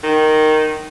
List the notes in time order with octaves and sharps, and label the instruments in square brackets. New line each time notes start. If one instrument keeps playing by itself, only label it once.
[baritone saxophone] D#3